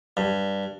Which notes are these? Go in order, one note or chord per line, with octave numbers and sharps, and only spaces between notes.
G2